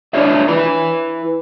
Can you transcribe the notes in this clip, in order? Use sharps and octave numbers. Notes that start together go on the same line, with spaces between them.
D4 E4 G4 C#5 D5 E5
E4 B4 B5